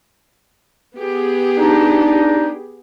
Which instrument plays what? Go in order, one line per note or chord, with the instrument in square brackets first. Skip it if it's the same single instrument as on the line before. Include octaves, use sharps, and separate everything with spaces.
[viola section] B3 G4 G#4
[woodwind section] D4 D#4